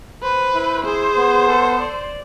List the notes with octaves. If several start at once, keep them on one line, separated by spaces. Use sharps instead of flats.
B4 C5
E4
G#4 C5
B3
A4
D5